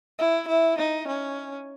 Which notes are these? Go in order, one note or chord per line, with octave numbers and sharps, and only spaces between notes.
E4
E4
D#4
C#4